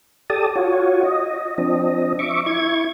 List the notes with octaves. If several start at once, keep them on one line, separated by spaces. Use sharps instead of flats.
G4 A4 D5 A5 D#6
F4 F#4 C#5
D#5
F3 C4 D4 D#5
E5 C#6 D6
E4 C#6 G#6